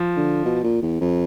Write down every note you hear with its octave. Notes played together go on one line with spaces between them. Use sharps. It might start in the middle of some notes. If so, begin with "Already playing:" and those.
Already playing: F3
D3
B2
A#2
E2
F2